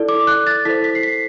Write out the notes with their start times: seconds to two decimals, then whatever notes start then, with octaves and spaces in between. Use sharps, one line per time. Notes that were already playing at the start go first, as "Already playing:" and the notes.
Already playing: E4 A4 D5
0.09 D6
0.27 F#6
0.47 A6
0.65 E4 A4 C5 B6
0.84 B6
0.95 C7
1.03 B6